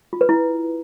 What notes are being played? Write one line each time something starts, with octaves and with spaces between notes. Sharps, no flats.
F4
B4
E4